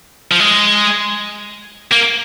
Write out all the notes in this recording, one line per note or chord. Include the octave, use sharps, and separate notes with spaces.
F3
G#3
A#3